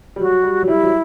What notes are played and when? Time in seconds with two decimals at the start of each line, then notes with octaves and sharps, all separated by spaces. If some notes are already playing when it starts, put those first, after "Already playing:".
0.16 G3
0.20 F#3 F#4
0.43 G3
0.62 F#3
0.67 G3 E4
0.83 F#3